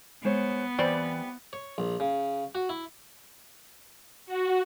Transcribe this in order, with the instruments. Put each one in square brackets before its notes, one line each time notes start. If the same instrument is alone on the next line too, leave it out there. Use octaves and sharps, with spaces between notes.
[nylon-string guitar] G#3 C5 C#5 [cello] B3
[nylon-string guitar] E3 [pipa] G3 C4 D5
[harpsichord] C#5
A#1
C#3
F#4
E4
[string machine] F#4